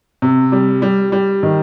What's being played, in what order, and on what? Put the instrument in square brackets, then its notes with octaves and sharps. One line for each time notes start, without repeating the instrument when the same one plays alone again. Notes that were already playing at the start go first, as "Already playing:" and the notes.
[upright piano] C3
G3
G3
G3
D#3